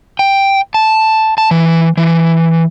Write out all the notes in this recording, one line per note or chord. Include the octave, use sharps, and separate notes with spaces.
G5
A5
A5
E3
E3